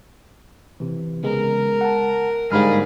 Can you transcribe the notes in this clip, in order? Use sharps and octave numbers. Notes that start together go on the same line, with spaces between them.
C3 E3
C#3 G#3 B3 A#4
F#5 A5
G#2 D3 G3 A#3 G#4 F5 B5 F6